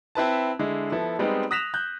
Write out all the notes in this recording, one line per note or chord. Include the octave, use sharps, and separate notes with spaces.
C4 E4 B4 A5
D3 G#3 E4
F3 B3 E4 A4
G3 G#3 B3 C4 D#4
D#6 F#6 A#6 B6 E7 F7
F#6 G6